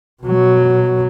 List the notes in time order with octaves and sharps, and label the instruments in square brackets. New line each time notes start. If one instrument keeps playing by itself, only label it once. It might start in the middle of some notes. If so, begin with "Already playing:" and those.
[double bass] B2 F#3